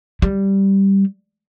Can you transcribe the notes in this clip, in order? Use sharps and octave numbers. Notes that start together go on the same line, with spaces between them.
G3